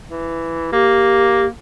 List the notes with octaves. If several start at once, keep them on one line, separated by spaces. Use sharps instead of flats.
E3
A#3 G4